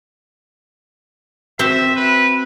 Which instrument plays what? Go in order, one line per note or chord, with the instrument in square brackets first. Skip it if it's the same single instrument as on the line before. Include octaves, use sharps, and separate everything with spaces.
[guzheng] C4 F#4 C5 [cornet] E5
[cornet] B4